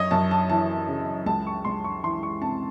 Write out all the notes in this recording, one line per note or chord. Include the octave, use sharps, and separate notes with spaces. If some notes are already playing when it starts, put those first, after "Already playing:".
Already playing: F#2 C#5 D#5
F#2 A5
A5
E3 A5
C#3
C#2 A5
C#6
C#2 C6
C#6
E3 C6
C#6
C3 A5